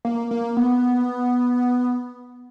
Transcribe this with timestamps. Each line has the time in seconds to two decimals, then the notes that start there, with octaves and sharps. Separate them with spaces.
0.05 A#3
0.31 A#3
0.57 B3